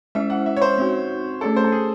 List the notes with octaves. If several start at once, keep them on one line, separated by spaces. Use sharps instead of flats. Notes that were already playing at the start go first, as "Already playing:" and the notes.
G#3 C#4 E4 C5 E5
F#5
E5
C#5
C5
C4 D#4 F#4
A3 C#4 G#4 A4 C#5
C5
A4
G#4